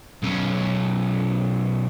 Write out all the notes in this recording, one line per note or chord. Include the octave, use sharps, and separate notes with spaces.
B1 C#4